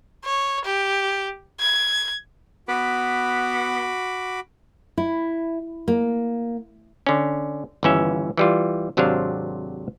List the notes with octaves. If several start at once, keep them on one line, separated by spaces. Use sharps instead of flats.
C#5
G4
G#6
B3 F#4 B5 D6
E4
A#3
D3 C#4
G1 D#2 E3 C#4 E5
E3 G3 F4
G#1 C3 F#3 D4 C5 F5